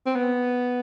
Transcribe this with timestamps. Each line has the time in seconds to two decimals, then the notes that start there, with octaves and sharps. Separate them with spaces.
0.06 C4
0.15 B3